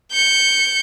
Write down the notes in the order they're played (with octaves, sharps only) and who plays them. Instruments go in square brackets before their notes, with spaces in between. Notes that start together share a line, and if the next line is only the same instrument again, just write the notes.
[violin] G6 C#7